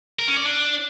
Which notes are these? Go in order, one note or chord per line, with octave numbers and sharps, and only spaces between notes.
A#4
C#4
D5
D4